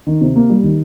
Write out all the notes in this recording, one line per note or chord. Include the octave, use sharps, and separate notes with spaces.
D#3
C3
A#3
G3
D#3